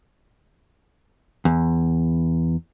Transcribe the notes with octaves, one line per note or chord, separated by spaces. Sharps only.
E2